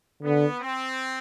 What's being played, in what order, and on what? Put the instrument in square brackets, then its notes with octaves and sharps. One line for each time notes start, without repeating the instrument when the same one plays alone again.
[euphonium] D3 [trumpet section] B3
[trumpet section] C4